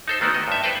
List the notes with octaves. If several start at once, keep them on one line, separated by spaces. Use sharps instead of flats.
D#4 A4 C5
D#3 A3 B3 F#4 D5
D#5
G2 E5
A4 B4 C5 G5 A5